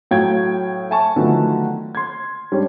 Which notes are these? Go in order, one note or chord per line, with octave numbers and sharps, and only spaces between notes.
A2 F#3 F5 G5 G#6
E5 G#5 A5 C#6
D3 D#3 F3 F#3 A3 B3
C6 G#6
G3 G#3 C#4 D4